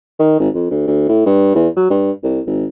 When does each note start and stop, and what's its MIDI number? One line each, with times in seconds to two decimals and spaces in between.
0.19 0.35 51
0.39 0.49 32
0.54 0.67 41
0.70 0.87 38
0.87 1.06 38
1.09 1.24 45
1.26 1.54 43
1.55 1.68 40
1.76 1.90 54
1.90 2.11 43
2.24 2.40 36
2.46 2.66 32